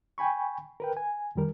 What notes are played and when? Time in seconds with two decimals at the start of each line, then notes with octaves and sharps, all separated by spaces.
0.18 G5 G#5 B5 C#6
0.80 A#4 B4 G5
0.97 G#5
1.35 F2 D#3 G3 A#4